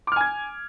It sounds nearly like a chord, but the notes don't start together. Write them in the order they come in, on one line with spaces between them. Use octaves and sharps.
D6 F6 G#5 G#6